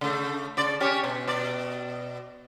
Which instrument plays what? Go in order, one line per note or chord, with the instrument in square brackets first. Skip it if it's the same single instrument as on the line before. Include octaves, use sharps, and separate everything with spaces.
[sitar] C#3 A3
C#3 D5
C#4 G4 C#5
B2
B2 D5